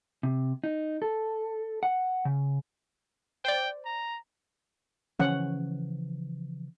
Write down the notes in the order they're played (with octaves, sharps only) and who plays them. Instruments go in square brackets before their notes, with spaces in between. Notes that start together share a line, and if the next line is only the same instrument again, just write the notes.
[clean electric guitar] C3
D#4
A4
F#5
C#3
[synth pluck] C5 D5 [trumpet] G5
[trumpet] A#5
[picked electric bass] C#3 E3 F3 [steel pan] C#4 F#5